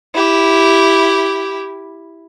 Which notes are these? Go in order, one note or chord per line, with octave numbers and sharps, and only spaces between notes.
E4 G4